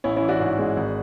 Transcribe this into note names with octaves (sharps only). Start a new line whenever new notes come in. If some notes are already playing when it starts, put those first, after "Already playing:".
A1 C#4 E4
C#4 E4
E3
D4 F#4
G#2
G#3
G#1